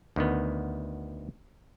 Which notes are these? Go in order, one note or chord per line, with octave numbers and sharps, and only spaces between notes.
D2 D#3 B3